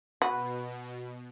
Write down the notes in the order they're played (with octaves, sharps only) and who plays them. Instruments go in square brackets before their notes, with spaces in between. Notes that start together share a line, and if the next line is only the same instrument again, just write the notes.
[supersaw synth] B2 [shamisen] F#4 [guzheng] B4